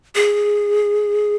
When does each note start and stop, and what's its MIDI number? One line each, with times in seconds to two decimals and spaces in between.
0.15 1.36 68